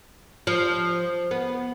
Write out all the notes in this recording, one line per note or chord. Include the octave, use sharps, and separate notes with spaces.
F3
B3